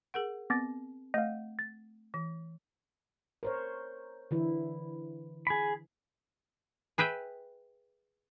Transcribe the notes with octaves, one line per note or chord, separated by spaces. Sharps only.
G#4 A#4 F#5
B3 C4 D6 A6
A3 D#5 F5
A6
E3
A#4 C5 C#5
D3 E3 E4
G#4 B5
G#4 B4 E5 G5